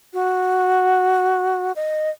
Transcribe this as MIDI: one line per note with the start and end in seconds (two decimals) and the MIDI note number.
0.14 1.72 66
1.76 2.10 75